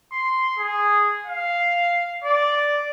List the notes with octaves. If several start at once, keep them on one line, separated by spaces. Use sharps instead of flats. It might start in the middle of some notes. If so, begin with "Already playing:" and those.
C6
G#4
F5
D5